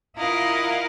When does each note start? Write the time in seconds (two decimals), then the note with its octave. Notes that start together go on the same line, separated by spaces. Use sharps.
0.16 E4 F4 A#4 D#5 F5 F#5